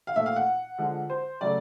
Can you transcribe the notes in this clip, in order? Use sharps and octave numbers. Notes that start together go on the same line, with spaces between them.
F5
A#2 F3 A3 E5
F5
F#5
D3 F3 G#3
C5
C#3 F#3 A3 D5